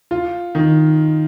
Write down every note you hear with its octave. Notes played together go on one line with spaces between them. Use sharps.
F4
D#3